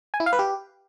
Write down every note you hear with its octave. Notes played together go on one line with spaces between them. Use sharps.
G#5
E4
F5
B4
G4